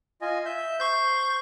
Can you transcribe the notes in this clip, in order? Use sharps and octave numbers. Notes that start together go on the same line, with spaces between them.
F4 D#5 G#5
E5 G6
C5 C6 C#6 G6